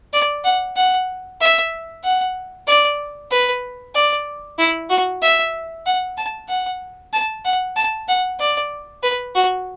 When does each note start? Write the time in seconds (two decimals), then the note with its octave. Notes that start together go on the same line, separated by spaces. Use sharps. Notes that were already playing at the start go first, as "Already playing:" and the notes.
0.13 D5
0.44 F#5
0.76 F#5
1.41 E5
2.04 F#5
2.67 D5
3.31 B4
3.95 D5
4.59 E4
4.90 F#4
5.22 E5
5.86 F#5
6.17 A5
6.48 F#5
7.13 A5
7.45 F#5
7.76 A5
8.08 F#5
8.39 D5
9.03 B4
9.35 F#4